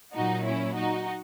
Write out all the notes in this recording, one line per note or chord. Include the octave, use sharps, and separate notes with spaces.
A#2 F#3 D#4 F#4
C#4 E4
D#4 F#4